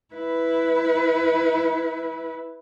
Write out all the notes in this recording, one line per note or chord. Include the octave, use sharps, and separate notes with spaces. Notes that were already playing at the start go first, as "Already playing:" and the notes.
E4 B4